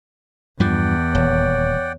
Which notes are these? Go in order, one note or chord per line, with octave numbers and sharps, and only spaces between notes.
E2 G2 F3 D5 F#5 G5
D#1 C#5